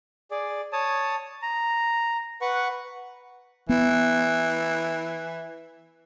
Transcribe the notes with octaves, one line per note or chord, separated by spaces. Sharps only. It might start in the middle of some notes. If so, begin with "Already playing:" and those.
G#4 D5
C#5 A5 D#6
A#5
B4 F#5 C#6
E3 B3